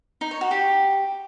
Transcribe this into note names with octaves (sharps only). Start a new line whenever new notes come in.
D#4
C#5
F#4
G4